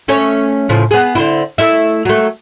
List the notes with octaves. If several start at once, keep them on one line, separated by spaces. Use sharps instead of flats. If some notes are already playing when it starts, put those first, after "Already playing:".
A3 C#4 C#5
A2 C#3 F3
B3 G#4
D3 C4 E4
A3 E4 E5
F#3 A3